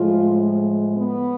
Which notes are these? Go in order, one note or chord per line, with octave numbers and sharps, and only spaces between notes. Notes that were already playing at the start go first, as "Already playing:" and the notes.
Already playing: A2 F3 G#3 F4
B3